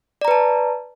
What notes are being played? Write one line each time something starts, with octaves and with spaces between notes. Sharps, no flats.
B4 D5 A5 A#5